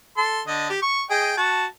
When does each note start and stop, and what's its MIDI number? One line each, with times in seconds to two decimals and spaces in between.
0.17 0.41 69
0.17 0.41 84
0.47 0.69 50
0.47 0.69 75
0.70 0.82 67
0.82 1.03 85
1.10 1.32 68
1.10 1.32 75
1.10 1.32 79
1.37 1.65 66
1.37 1.65 81